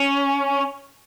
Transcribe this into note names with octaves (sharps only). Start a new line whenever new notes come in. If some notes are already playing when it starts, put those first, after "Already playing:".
Already playing: C#4